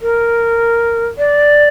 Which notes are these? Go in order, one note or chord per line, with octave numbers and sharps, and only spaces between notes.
A#4
D5